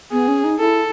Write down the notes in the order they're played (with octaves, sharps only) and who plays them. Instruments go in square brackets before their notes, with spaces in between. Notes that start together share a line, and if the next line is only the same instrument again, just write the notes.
[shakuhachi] B3 [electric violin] G#4
[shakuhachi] C#4
D#4
[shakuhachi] E4 [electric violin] A4